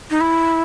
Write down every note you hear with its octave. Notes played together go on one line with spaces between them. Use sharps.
D#4
E4